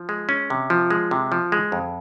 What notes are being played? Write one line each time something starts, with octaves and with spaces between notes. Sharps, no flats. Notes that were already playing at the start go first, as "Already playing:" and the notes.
Already playing: F3
G#3
C#4
C3
F3
G#3
C3
F3
G#3
F2